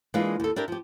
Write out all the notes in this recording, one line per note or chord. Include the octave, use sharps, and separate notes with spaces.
E3 G#3 A#3 D4 F4 G#4
D#2 A4
D4 E4 G4 A#4
F3 G4